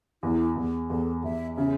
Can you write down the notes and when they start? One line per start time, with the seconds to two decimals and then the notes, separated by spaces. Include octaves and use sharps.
0.23 E2 E4
0.56 E2
0.90 E2 A4
1.23 E2 E5
1.57 C#3 E5